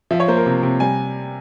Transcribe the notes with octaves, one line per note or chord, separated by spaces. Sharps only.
F3 E5
C#5
A#3 C5
A#4
C3
C3
G3 G#5